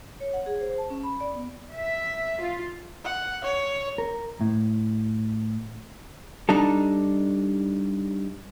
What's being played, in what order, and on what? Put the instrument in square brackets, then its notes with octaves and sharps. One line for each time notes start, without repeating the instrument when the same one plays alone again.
[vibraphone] C#5
F#5
G#4
C5
A5
C#4
B5
D5
B3
[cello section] E5
F4
[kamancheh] F#5
C#5
[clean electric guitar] A#4
A2
[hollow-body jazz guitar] G3 D4 D#4 A4